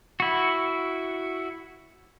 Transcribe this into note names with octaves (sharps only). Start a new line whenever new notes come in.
E4 F#4